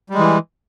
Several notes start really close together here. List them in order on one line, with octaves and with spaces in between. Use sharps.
G3 G#3 E3